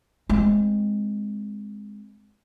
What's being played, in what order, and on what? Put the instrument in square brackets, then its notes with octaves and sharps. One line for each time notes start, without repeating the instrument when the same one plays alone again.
[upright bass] G#3 C4